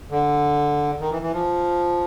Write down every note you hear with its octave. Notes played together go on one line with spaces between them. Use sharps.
D3
D#3
E3
E3
F3